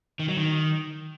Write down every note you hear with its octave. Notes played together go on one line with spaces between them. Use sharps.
D#3
F#3
D#3